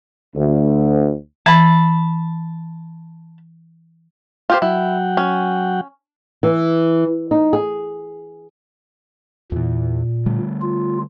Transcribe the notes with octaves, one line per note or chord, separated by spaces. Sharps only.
D2
E3 A5 B5
F4 G4 C5
F#3 E4 F#5 G5
C#4
E3
D#4
G#4
E2 A#2 E3
D3 G3 A3
F4